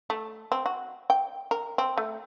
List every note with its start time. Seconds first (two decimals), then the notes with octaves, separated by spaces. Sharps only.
0.10 A3
0.52 C4
0.66 F#4
1.10 G5
1.51 A#4
1.78 C4
1.98 A3